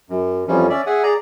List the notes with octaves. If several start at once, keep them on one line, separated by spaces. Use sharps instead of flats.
F#2
F2 E3 F3 G3 C#4
C#4 D5 E5
G#4 E5 F#5 G#5
G#4 D5 A#5